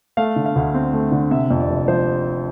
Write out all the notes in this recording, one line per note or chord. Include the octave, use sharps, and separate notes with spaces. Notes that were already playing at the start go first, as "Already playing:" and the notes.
A3 F5
D3
F5
D2
C4
A3
D3
C3 E5
F2
D5
F1
F3 C5